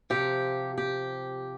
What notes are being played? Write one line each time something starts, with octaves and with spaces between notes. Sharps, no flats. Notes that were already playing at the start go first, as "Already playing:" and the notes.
C3 F3 G4
G4